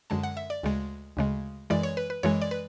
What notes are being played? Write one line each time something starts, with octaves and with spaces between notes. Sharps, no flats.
F#2 D3 G#3 A5
F#5
E5
D5
D2 C#3 G#3
D2 C#3 G#3
F#2 E3 G#3 D5
C#5
B4
B4
F#2 E3 G#3 C#5
D5
B4